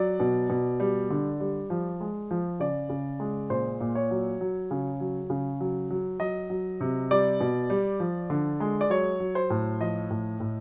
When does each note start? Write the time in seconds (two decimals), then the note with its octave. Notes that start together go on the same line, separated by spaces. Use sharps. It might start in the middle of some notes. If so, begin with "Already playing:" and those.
Already playing: F#3 D5
0.20 B2
0.50 B2
0.80 G3
1.10 D3
1.40 G3
1.70 F3
2.00 G#3
2.31 F3
2.60 C#3 D5
2.89 C#3
3.20 G#3
3.50 A#2 C5
3.81 A#2
3.95 C#5
4.11 F#3
4.41 F#3
4.71 C#3
5.00 F#3
5.30 C#3
5.60 F#3
5.90 F#3
6.20 F#3 D#5
6.50 F#3
6.81 C3
7.11 G3 D5
7.41 B2
7.70 G3
8.00 F3
8.30 D3
8.60 G#3
8.81 D5
8.90 F#3 C#5
9.20 F#3
9.35 C5
9.50 A2
9.81 F3 D#5
10.10 A2
10.40 A2